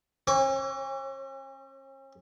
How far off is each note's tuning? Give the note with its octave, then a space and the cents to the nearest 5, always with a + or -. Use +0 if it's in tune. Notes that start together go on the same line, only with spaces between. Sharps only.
C#4 -45 C#5 -25 D6 -45